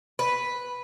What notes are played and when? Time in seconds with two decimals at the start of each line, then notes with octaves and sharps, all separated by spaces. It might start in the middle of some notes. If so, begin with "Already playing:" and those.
0.19 B4